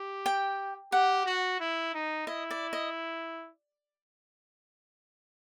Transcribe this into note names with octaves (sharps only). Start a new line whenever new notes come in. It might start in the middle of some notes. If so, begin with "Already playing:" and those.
Already playing: G4
G5
G4 F#5
F#4
E4
D#4
E4 D#5
D5
D#5